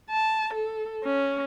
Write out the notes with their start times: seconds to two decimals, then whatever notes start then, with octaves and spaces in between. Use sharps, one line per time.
0.10 A5
0.54 A4
1.04 C#4